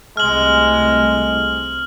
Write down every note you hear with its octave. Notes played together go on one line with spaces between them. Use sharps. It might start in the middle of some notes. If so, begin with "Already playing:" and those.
C2 C3 G#3 A3 F6 F#7